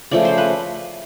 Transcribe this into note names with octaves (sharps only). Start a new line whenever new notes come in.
C#3 F3 A3 D5
C5
B4